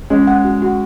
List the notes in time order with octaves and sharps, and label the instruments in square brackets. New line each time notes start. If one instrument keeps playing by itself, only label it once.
[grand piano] G#3 [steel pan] C#4
[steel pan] F#5
F#4
F#4